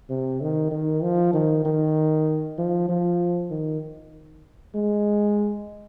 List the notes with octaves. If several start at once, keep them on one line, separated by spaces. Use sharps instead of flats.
C3
D#3
D#3
F3
D#3
D#3
F3
F3
D#3
G#3